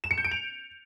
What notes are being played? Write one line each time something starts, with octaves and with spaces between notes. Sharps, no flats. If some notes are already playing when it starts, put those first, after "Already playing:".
E7
C#7
G6
D7
F7